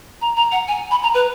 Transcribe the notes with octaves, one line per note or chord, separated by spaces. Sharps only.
A#5
A#5
F#5
G#5
B5
A#5
B4